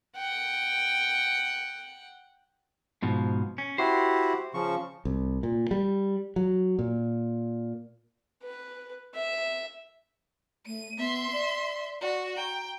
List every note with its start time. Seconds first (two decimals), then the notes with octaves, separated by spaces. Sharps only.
0.16 F#5 G5
3.02 G#2 B2 F3
3.58 C#4
3.78 E4 F#4 G4 C5
4.54 C#3 F3 C#6
5.05 C2
5.43 A#2
5.71 G3
6.36 F#3
6.79 A#2
8.43 B4
9.14 E5
10.66 A3 D#7
10.98 B3 E5 C6
11.32 D5
12.01 F#4 D5
12.37 G5 A#5